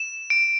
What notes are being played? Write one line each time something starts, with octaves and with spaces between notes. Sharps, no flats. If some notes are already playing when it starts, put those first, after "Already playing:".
Already playing: E7
D7